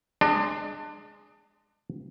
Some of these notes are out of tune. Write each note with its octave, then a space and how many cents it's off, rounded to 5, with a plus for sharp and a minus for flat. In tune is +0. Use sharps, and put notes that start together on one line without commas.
G#3 +0 D4 +25